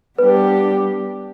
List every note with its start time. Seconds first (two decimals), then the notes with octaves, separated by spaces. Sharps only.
0.18 G3 B3 D4 G4 B4